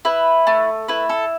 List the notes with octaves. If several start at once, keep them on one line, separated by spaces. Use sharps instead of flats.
E4 B4
A3
E4 B4
A4